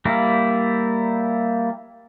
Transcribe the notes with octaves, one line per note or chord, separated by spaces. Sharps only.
G3 A#3 E4